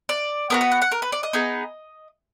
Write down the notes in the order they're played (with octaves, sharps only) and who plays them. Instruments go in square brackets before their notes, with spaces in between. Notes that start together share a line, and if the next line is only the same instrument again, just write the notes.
[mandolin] D5
B3 D4 F#4 A#4
B4
F#5
F#5
A#4
B4
D5
D#5
B3 D#4 G#4